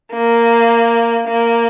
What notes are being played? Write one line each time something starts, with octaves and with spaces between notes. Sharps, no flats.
A#3
A#3